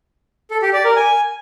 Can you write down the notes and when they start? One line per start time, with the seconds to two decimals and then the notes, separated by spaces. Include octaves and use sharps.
0.51 A4
0.62 G4
0.73 D5
0.85 A#4
0.96 G#5